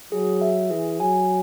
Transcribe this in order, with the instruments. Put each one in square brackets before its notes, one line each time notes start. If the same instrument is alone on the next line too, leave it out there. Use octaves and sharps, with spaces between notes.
[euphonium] F#3 [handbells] G#4
[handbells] E5
[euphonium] E3 [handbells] G#4
[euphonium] F#3 [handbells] G#5